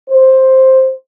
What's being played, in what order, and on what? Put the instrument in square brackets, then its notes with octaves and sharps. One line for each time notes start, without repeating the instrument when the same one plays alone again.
[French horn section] C5